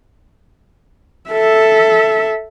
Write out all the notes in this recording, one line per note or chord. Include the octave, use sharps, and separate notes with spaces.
A4 E5